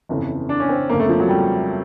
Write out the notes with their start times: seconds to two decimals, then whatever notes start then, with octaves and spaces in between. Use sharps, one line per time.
0.09 G1 F2 C#3 E3
0.49 D4
0.60 C#4
0.69 C4
0.90 G1 F2 C#3 A#3
0.99 A3
1.09 F3
1.20 F#3
1.29 G3